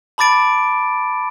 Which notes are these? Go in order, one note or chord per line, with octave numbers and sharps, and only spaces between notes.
A5 B5 D6 A6 D7